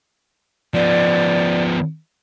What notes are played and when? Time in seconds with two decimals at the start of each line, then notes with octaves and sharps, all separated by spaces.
0.74 F3 B3 D5